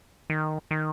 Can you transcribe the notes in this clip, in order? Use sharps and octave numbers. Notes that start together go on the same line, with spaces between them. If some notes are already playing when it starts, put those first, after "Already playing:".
D#3
D#3